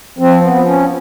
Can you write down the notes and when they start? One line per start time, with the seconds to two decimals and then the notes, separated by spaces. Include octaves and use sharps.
0.19 F3 C4
0.41 B3
0.53 F3
0.65 C#4